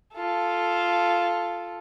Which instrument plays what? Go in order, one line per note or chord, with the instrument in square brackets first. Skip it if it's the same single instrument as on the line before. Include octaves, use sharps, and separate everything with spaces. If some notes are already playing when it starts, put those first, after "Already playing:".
[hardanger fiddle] F4 A4